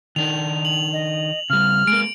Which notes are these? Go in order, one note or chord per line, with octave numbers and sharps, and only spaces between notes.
D#3 D4 D#4 F7
F#7
D#5
C#3 G3 F6
G#3 A#3 D7